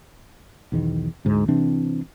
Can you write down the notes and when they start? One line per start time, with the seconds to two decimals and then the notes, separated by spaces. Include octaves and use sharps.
0.72 B1 E2 D#3
1.25 D2 G#2
1.48 C3 E3 C4 D4